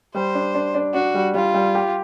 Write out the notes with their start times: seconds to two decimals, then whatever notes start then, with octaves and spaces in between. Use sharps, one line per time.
0.15 G3 C5
0.35 D4
0.55 D4
0.75 D4
0.94 D4 F#4
1.14 G3
1.34 G3 F4
1.54 G3
1.75 G4